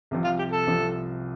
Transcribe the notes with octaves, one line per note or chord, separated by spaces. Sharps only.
C2 C3 F3
F4
G4
A4
C2 C3 F3